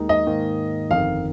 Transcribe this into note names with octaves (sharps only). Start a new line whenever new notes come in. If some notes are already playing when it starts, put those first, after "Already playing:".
Already playing: D#2 D#3 G#3 D#4
D#5
G#2 D#3 A#3
G1 F2 D#3 F5